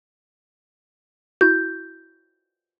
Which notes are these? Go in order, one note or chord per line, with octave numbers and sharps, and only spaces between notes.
E4 F#4 G6